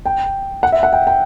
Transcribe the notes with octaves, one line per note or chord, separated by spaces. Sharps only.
G5
F#5
E5
F#5
G5
G5